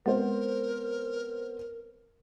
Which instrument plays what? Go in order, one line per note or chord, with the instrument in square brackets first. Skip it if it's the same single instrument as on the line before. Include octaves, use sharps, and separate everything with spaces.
[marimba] G#3 [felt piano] B3 C4 C5 [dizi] A#4